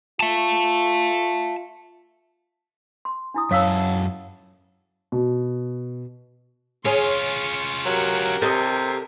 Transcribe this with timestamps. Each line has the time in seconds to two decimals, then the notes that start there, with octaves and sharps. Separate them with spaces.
0.20 F4 E5 A5
3.05 C6
3.34 D4 E4 D#6
3.51 F#2 A4 C#5 F5 E6
5.12 B2
6.85 C#4 F4 G#4 C#5 C6
7.85 F#3 G4 A#4
8.42 C3 A4 D#5